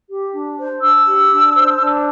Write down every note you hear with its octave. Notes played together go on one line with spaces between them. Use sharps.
G4
D4
C5
D4 E6
G4
D4
C5
D4